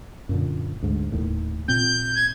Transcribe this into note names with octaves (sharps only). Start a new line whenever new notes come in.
F#2 A#2 D3
D2 G#2
D#1 D#2 A2
A#2 C4 G6
G#6